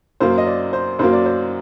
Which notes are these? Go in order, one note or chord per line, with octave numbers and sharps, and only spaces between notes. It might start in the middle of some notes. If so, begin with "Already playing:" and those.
F#2 F#3 A#3 C5
D#5
D5
C5
F#2 F#3 A#3 C5
D5
C5